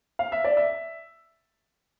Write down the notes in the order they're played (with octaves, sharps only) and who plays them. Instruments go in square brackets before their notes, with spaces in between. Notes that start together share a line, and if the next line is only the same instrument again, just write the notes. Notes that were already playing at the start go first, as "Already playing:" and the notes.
[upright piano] F5
E5
D5
E5